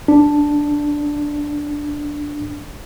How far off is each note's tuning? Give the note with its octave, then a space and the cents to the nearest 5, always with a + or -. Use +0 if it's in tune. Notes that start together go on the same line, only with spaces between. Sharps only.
D4 +0